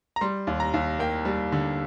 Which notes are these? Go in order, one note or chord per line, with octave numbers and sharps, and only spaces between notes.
A#5
G3 C6
D#2
A#5
D#2
A#3 G5
G3
D3